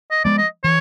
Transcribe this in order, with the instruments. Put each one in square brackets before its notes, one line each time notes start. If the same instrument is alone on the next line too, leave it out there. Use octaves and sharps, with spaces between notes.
[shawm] D#5
[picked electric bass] F3 G#3 B3 [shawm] D5
[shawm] D#5
[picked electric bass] E3 [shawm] C#5